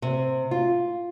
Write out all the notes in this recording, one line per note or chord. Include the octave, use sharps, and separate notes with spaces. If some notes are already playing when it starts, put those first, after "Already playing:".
C3
F4